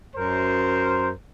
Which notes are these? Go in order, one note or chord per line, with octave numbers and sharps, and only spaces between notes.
F#2 A#4 C5